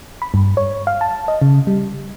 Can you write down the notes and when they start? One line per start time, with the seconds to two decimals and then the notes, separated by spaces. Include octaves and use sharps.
0.22 B5
0.34 G2
0.57 C#5
0.87 F5
1.01 A5
1.28 D#5
1.42 C#3
1.67 G3